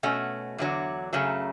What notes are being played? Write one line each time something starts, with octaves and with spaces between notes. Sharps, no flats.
B2 A3 C#4 F#4
E2 D3 F#3
F#2 C#3 F#3 A3